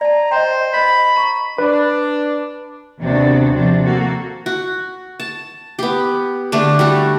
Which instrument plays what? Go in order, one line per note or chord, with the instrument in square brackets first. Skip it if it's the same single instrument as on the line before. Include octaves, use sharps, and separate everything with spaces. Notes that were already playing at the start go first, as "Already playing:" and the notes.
[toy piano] D5 A5 [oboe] A#5
[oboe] C5 [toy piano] D#5 G5
[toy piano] C5 D#5 [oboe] B5
[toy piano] A#5 C#6
[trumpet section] D4 [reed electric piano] B4
[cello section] D#2 C3 B3 D4 F#4
C3 F3 D4
A#3 F#4 A4
[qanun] F#4
A5
B3 G4
D3 A3 D4
G3 F#4 A4